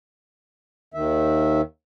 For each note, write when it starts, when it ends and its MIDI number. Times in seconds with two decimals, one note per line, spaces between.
0.94 1.61 39
0.94 1.61 51
0.94 1.61 76